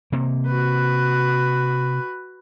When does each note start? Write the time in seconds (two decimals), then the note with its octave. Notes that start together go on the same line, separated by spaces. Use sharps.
0.12 C3 A#3
0.47 F#4 B4